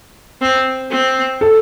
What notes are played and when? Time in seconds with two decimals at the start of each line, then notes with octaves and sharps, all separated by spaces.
0.41 C4
0.91 C4
1.41 A4